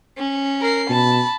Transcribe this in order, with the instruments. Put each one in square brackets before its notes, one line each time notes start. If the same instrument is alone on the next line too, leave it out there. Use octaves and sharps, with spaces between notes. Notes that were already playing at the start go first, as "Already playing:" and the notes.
[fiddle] C#4
[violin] A#4 C7
[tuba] B2 [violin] A5 B5